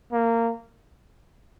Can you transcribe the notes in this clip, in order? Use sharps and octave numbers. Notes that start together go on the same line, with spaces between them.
A#3